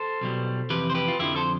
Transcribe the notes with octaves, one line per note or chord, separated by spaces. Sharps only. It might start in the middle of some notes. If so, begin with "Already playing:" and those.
Already playing: A4 C5
B1 B2 G3
F2 C3 E3 G4 B4
C5
G4 B4
F4
F2 D3 F3 E4 G4
A4 C5